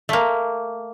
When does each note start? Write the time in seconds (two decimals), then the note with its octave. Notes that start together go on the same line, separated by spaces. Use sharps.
0.09 A3 A#3